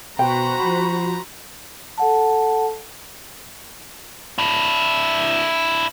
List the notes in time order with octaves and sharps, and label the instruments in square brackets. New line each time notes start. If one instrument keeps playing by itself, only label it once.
[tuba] B2 [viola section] F#4 C5 B5 [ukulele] G5 [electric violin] A#5
[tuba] F3
[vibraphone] A4 F#5 A5
[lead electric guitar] D4 E4